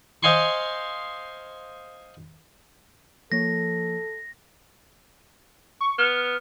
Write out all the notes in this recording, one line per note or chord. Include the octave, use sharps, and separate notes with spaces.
C5 D#5 F5 G#5 C6 C#6
F3 A#3 A4 C#5 A#6
C#6
B3 F6